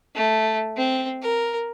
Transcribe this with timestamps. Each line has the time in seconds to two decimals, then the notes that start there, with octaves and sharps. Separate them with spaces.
0.15 A3
0.77 C4
1.23 A#4